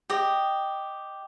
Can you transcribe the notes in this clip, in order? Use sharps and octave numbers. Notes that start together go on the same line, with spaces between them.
G4 D#5